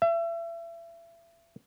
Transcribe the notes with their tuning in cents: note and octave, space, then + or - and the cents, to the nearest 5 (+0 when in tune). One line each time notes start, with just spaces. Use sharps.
E5 +35